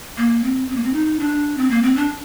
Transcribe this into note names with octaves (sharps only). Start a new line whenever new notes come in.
A#3
C4
C4
A#3
C4
D#4
D4
C4
A#3
C4
D4